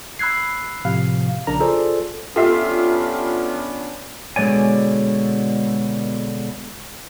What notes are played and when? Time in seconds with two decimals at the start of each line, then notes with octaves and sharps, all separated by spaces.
0.19 B5 E6 F#6 G#6 C7
0.85 A2 C3 F3 F5
1.47 A#1 C#3 D4 A#4 A#5
1.60 F4 G#4 A4 C5 D5
2.36 B3 C#4 D4 F4 G4 A4 E5 C7
4.36 B2 D3 G#3 C#5 D5 G#5